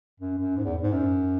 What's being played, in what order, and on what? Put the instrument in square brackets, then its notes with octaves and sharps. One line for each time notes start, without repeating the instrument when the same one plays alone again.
[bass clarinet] F#2
F#2
G#2
E2
G#2
F#2